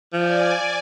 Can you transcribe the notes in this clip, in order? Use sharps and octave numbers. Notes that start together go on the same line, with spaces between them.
F3 D5 G#5